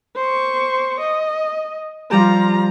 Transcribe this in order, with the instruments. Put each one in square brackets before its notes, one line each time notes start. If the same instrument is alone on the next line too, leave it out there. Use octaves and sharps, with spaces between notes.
[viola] C5 C#6
D#5
[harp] F3 G3 G4 [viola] F4 A#5